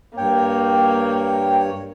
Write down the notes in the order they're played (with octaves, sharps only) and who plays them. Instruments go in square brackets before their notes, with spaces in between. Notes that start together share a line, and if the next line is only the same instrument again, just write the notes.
[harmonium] G2 C#5 [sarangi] A#3 [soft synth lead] G5